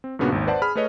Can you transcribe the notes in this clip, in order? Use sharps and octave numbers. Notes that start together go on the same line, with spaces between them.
C4
G2 A#2 C#3 B3 D4 F#4
G#1 D#2
B4 C5 D5 F#5 A5
G#4 B5 F6
A3 G#4 B4 C#5 D#5